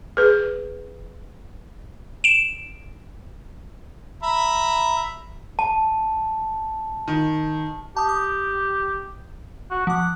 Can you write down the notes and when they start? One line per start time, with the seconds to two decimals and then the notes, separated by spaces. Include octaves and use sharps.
0.17 G#4 B4
2.24 D7 E7
4.23 E5 A#5 B5
5.59 A5
7.08 D#3
7.97 G4 A5 D#6
8.09 D#6
9.71 F#4
9.87 F3 F#5 D6